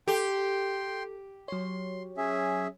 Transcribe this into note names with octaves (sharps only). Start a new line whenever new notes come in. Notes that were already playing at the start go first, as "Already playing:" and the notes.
G4 A4 G5 C6
F#3 C#5 C6
C#4 G#4 E5